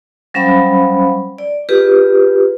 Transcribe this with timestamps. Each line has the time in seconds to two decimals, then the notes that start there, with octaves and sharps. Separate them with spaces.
0.34 F#3 G3 C#4 C5 F5 B5
1.38 D5
1.69 F4 G4 G#4 B4